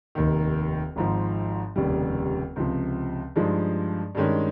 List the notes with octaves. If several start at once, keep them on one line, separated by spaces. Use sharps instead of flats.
F1 D#2 D#3
G#1 G#2 F3
F1 D#2 C#3 G3
C#2 C3 F3
G2 F3 G#3 D#4
G2 D#3 G#3 C#4